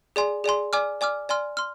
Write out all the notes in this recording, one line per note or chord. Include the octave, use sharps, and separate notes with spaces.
G#4 D5 G#5 C6
G#4 D5 G#5 C6
D5 G#5 D6 F6
D5 G#5 D6 F6
D5 G#5 C6 F6
C6 F6